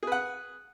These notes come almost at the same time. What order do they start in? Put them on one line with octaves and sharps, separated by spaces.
G#4 B4 F#5